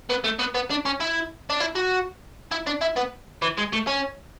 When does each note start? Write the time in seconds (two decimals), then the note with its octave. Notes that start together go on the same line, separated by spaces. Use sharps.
0.10 B3
0.24 A3
0.39 B3
0.55 B3
0.70 D4
0.85 C#4
1.00 E4
1.50 D4
1.60 E4
1.75 F#4
2.51 E4
2.66 D4
2.81 E4
2.96 B3
3.42 E3
3.57 G#3
3.73 A3
3.87 C#4